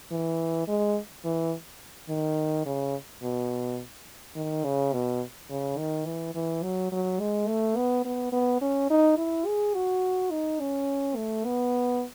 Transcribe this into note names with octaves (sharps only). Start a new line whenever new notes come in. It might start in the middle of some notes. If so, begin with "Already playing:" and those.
E3
G#3
E3
D#3
C#3
B2
D#3
C#3
B2
C#3
D#3
E3
E3
F#3
F#3
G#3
A3
B3
B3
B3
C#4
D#4
E4
G#4
F#4
D#4
C#4
A3
B3